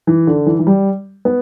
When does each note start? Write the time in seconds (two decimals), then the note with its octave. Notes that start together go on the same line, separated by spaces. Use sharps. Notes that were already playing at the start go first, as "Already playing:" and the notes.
0.07 E3
0.27 D3
0.46 E3
0.59 E3
0.67 G3
1.25 B3